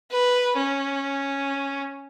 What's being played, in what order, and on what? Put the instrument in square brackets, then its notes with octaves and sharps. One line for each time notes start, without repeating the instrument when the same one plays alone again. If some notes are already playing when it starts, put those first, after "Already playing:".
[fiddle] B4
C#4